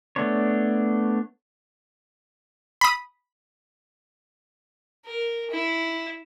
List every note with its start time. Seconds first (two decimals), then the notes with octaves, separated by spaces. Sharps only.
0.16 A3 B3 D4 C#5
2.81 B5 D#6
5.06 A#4
5.51 E4